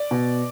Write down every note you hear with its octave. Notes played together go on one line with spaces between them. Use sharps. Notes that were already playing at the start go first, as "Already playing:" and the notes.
Already playing: D5
B2